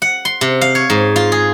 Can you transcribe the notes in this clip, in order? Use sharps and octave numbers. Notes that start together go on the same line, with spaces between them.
F#5
C6
C3
F5
C#5
G#2
F4
G#4